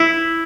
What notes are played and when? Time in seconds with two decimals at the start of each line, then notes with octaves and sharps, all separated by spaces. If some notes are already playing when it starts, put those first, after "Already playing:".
Already playing: E4